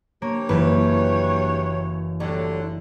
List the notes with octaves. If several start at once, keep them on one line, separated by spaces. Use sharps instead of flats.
G2 A#3 C#5
F#1 E3 B4
A2 D3 F#3 G3